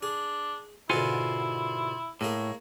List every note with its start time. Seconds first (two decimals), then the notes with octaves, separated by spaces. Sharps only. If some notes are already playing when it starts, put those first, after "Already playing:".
0.03 D4 G#4
0.90 G#2 B2 D3 E4 F4 F#5 G#5
2.21 A2 G#3 A#3 G#4 C#5